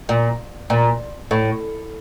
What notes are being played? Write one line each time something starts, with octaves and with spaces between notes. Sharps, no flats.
A#2
A#2
A2